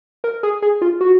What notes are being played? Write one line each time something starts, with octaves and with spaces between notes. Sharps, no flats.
A#4
G#4
G#4
F4
F#4